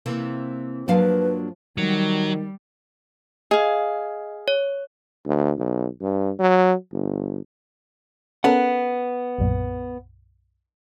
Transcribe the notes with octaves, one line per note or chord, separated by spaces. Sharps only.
C3 E3 A#3
G2 F3 F#3 A#3 D4 B4 F5
D#3 F#3 G3
G#4 D#5 F5
C#5
D2
B1
G2
F#3
G1
B3 C#4 A4 A#4 F#5
B1 F#2 A#2